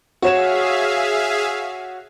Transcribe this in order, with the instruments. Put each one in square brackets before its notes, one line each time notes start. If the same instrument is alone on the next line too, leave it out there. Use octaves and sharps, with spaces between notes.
[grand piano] F#4 C#5 E7 [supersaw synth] G#4 E5 F5